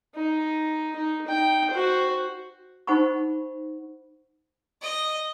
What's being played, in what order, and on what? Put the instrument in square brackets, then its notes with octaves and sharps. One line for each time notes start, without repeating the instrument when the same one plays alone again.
[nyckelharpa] D#4
D#4
D#4 G5
F#4 C5
[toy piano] D#4 C5 F#5 B5 C#6
[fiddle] D#5